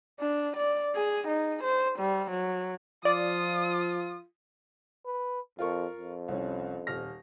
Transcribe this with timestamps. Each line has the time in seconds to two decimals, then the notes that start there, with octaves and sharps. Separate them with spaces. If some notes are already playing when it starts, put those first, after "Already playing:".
0.20 D4
0.57 D5
0.95 G#4
1.28 D#4
1.64 C5
1.99 G3
2.30 F#3
3.05 F3 F4 D5 D#6
5.05 B4
5.59 F2 F4 A#4 C#6
5.96 F2
6.28 C2 C#4
6.87 D#1 F6 A#6